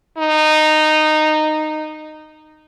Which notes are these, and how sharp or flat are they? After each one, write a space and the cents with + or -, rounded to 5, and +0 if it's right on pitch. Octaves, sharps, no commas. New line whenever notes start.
D#4 -15